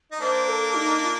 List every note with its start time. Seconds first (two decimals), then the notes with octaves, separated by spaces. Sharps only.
0.12 D#4
0.20 A#3 D4 C5
0.47 A4
0.75 D#4
1.02 F4